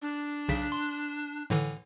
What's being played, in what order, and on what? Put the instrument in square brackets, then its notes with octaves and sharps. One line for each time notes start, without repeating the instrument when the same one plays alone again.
[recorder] D4
[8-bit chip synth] B1 C#3 B6
C6
A2 D3 E3